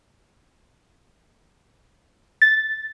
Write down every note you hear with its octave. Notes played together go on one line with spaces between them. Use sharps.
A6